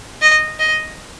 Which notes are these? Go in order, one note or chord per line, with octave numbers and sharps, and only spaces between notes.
D#5
D#5